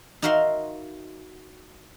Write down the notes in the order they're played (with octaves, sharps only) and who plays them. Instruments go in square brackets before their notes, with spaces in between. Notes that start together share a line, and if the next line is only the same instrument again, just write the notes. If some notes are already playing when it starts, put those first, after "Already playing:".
[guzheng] D#4 F#4 A#4 E5 F5 C6